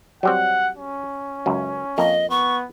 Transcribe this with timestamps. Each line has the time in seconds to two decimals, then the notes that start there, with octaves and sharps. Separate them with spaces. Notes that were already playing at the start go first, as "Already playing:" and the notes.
0.23 F#3 G3 C4 F#5
0.77 C#4
1.46 C#2 F#2
1.98 F2 A#3 D#5
2.30 B3 C#6